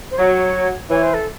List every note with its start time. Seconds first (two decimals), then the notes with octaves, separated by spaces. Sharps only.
0.11 C5
0.18 F#3 C#5
0.90 E3 C#5
1.03 C5
1.14 A4